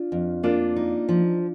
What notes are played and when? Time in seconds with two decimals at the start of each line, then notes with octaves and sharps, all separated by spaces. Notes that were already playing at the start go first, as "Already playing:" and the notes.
Already playing: D4 F4
0.12 F2
0.43 A#3 D4 F4
0.76 D#4
1.09 F3